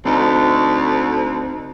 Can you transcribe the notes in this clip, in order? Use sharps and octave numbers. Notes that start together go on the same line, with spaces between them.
D2 C4 D#4